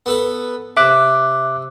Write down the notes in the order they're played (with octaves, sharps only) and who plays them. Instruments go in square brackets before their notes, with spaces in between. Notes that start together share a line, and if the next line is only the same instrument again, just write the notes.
[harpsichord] B3 A4 B4
[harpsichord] C3 [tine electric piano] E5 D6 F#6